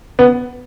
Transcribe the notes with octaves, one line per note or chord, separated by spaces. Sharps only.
B3